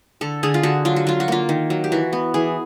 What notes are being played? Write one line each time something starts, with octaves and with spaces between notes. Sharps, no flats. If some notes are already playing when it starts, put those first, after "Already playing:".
D3 A4
D3 G#4
F4
D3 F#4
F#3 F4
F#4
F#3 F4
F#4
A#3 F4
D#3
F#3
G4
E3 F#4
B3
E3 G#4